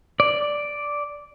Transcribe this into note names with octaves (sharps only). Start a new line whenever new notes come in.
D5